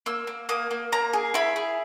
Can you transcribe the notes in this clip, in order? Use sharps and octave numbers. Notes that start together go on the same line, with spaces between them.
A#3 E6
A#3
A#3 D#6
A#3
A#3 A#5
G#4
E4 B5
G#4